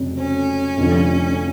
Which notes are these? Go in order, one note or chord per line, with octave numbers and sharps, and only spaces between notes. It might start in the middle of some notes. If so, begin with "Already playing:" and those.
Already playing: F1 F2 C#3 F#3
C#4
F1 F2 D3 F3